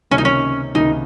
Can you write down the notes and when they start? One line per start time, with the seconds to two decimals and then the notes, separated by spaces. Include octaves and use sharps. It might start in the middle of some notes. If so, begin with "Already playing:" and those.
0.11 C#2 C3 D#3 A#3 C#4
0.18 D#4
0.25 C#4
0.74 C#2 C3 D#3 A#3 D#4